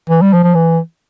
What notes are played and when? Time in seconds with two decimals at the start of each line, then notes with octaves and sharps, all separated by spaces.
0.10 E3
0.22 G3
0.33 F3
0.44 F3
0.55 E3